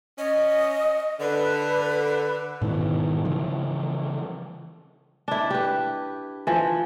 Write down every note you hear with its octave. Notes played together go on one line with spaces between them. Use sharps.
C#4 D#5
D3 B4
G#2 B2 D#3 E3
C#3 E3 F3
D4 E4
G4 B4
E3 F3